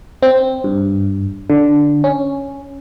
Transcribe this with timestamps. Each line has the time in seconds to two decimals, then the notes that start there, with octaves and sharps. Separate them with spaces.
0.22 C4
0.64 G2
1.50 D3
2.04 C#4